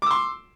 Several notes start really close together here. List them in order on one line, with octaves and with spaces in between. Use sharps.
D6 E6 C6